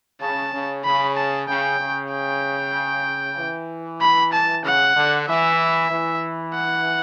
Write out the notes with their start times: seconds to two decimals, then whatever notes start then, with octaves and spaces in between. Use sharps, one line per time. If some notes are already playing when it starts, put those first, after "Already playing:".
0.21 C#3 A5
0.53 C#3
0.85 C#3 B5
1.17 A5
1.48 C#3 G5
1.80 C#3
2.12 G5
3.38 E3
4.01 B5
4.33 A5
4.64 C#3 F#5
4.97 D3
5.28 E3 E5
5.91 E3
6.55 F#5